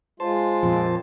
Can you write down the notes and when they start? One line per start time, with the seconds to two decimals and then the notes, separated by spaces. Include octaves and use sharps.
0.20 G#3 F4 C5 A5
0.63 F2 A#2